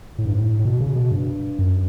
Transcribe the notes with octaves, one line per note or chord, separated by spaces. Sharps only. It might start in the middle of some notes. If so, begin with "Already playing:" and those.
A2
G2
A2
A2
B2
C#3
B2
G2
F#2